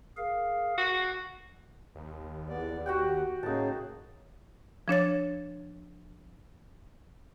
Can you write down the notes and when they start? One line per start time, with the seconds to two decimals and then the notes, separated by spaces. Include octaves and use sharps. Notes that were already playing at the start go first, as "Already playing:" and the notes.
0.17 G#4 A#4 F5
0.78 F#4
1.95 D#2
2.49 E2 B3 D5
2.86 F#4 G4 F#5 G5
3.43 A2 C#3 A#3 D#4 A5
4.88 F3 D4 C#5 A6